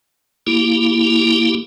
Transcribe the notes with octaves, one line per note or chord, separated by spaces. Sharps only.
A#3 E4 G4